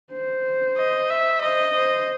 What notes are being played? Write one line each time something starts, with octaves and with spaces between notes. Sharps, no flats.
C5
D#5
E5
C5 D#5
C5